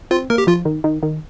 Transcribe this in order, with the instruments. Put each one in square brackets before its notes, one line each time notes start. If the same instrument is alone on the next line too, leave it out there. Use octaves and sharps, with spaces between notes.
[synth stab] C4 [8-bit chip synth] F4
[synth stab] A#3 [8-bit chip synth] A#4
[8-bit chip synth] G4
[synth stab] F3 [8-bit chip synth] F4
[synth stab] D#3
D#3
D#3